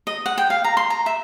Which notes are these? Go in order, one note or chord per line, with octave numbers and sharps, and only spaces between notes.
D#5
F#5
G5
F5
A#5
C6
A#5
E5